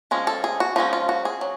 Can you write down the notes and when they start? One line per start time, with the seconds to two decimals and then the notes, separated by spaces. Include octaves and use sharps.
0.11 F3 G#3 C#4
0.27 A4
0.44 G#4
0.60 F#4
0.76 F3 G#3 C#4 D#4
0.93 F4
1.09 F#4
1.25 G#4
1.41 F#3